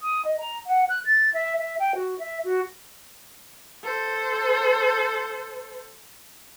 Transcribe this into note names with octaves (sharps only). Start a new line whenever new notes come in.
D#6
D#5
A#5
F#5
F#6
A6
E5
E5
G5
F#4
E5
F#4
A4 C5